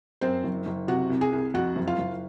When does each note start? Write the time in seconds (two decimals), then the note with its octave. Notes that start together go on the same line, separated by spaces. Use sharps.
0.21 F#2 C4 C5
0.44 F#1
0.66 F#1
0.88 C3 F#4 F#5
1.10 C2
1.21 G#4 G#5
1.33 C2
1.54 F2 F#4 F#5
1.76 F#1
1.87 F4 F5
1.98 F#1